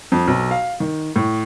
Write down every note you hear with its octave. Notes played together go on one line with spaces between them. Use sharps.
F2
B1
F5
D#3
A2